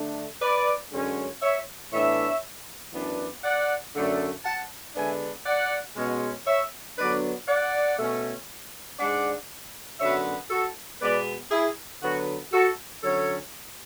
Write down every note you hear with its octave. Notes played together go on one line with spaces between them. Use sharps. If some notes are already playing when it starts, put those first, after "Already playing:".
Already playing: D3 A3 D4
B4 D5
F#2 D3 G#3 C#4
C#5 E5
A2 E3 B3 D4 C#5 E5
F#2 E3 B3 D4
D5 F#5
F#2 D3 A3
F#5 A5
D3 G#3 B3 D4 E5 G#5
D5 F#5
B2 G#3 C#4
C#5 E5
D3 F#3 B3 D4 B4 D5
D5 F#5
B2 A3 C#4
G#2 G#3 D4 D5 F#5
F#2 D3 F#3 B3 C#5 E5
F#4 A4
B2 G#3 B3 B4 D5
E4 G#4
D3 F#3 B3 F#4
F#4 A4
D3 F#3 C#4 A4 C#5